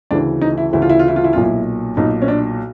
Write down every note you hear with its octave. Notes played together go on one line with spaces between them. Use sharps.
D2 C#3 E3 D4
D#4
E4
D2 C#3 E3 E4
F4
E4
F4
E4
F4
E4
B1 A#2 F4
E4
B1 A#2 D#4
C#4
D4